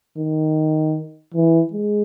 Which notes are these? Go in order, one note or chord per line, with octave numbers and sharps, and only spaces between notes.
D#3
E3
G#3